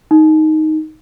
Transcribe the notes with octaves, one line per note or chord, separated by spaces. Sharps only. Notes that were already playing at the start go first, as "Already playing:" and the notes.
D#4